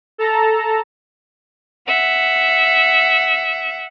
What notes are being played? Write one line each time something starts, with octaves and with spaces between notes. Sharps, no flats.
A4 A5 A#5
E5 F#5